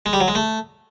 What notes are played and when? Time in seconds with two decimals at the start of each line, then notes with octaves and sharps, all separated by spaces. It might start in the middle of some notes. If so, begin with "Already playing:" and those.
0.06 G#3
0.13 G3
0.21 F#3
0.28 G#3
0.35 A3